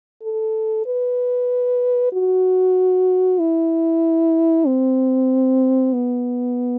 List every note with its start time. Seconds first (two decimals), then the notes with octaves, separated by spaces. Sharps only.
0.23 A4
0.86 B4
2.13 F#4
3.40 E4
4.67 C4
5.93 B3